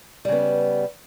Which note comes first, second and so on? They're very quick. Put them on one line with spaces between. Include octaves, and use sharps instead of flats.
G3 C#3 B3